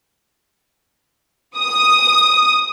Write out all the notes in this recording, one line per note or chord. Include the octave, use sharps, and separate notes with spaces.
D#6